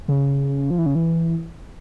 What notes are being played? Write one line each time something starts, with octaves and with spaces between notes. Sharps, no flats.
C#3
F3
E3
C#3
E3